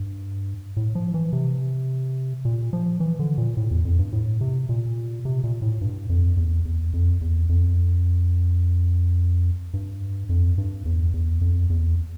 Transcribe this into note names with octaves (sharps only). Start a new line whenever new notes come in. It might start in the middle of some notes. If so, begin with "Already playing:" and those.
Already playing: G2
A2
F3
E3
C3
A#2
F3
E3
D3
A#2
A2
E2
F2
G2
A2
C3
A#2
C3
A#2
A2
G2
F2
E2
E2
F2
E2
F2
G2
F2
G2
E2
E2
F2
E2